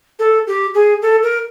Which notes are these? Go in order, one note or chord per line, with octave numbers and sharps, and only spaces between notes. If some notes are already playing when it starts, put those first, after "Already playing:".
A4
G4
G#4
A4
A#4